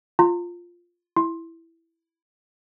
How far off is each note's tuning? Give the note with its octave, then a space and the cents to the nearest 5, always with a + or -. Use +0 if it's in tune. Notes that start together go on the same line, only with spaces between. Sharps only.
F4 +0 A#5 -30
E4 +5 C6 +15